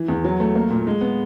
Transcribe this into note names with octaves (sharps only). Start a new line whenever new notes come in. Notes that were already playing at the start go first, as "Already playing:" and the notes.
Already playing: E3
E2
F#3
A3
A#3
A#2
G#3
B3